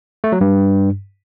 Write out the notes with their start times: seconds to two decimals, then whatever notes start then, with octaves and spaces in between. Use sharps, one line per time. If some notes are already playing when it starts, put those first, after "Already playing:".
0.24 A3
0.32 F#3
0.41 G2